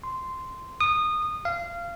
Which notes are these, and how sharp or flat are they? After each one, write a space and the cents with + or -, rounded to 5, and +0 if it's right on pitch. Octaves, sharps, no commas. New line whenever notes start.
C6 -10
D#6 -20
F5 -20